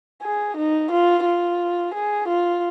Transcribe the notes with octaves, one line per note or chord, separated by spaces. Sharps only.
G#4
D#4
F4
F4
G#4
F4